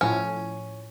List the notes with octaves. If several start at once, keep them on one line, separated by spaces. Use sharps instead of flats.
A2 F3 C#4